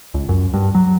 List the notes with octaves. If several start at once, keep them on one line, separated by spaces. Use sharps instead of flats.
C#2
F#2
G2
F#3